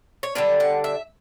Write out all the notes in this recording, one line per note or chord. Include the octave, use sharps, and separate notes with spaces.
C#5
D3 G3 D4 B4
F#5
E5